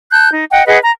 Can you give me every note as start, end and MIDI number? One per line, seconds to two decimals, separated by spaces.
0.11 0.30 81
0.11 0.30 90
0.11 0.30 91
0.31 0.43 63
0.51 0.64 75
0.51 0.64 78
0.51 0.64 79
0.66 0.78 68
0.66 0.78 71
0.66 0.78 75
0.66 0.78 78
0.83 0.92 82